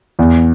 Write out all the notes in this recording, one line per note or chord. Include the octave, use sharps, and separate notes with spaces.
E2